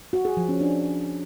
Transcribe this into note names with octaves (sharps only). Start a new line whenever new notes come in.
F#4
G#4
F3
C#4
D4